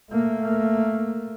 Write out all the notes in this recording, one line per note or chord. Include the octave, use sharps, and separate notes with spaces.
A3 A#3